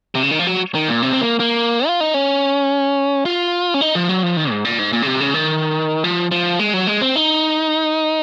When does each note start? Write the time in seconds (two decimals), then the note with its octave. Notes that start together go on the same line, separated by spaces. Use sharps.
0.15 C3
0.23 C#3
0.31 D#3
0.39 F3
0.47 F#3
0.75 D#3
0.89 A#2
1.02 C3
1.13 C4
1.21 A#3
1.40 A#3
1.87 F4
2.00 D#4
2.14 C#4
3.25 F4
3.74 C#4
3.81 D#4
3.95 F3
4.09 F#3
4.23 F3
4.37 D#3
4.51 G#2
4.65 A#2
4.79 G#2
4.93 A#2
5.02 C#3
5.07 C3
5.20 C#3
5.34 D#3
6.04 F3
6.31 F3
6.59 G#3
6.74 F#3
6.87 G#3
7.01 C4
7.16 D#4